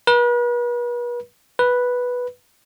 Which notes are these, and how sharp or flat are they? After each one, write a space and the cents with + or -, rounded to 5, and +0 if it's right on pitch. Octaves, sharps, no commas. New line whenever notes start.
B4 -40
B4 -5